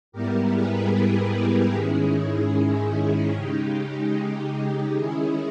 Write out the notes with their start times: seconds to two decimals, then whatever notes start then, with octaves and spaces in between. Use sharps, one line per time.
0.12 G#2 G3 B3 E4 G4 A#4
0.53 G#4 B4
0.93 G#4 B4
1.33 G#4
1.73 G#2 D#3 G#3 C#4 E4
3.34 C#3 G#3 D#4 G4
4.95 D#3 G#3 C#4 E4 G#4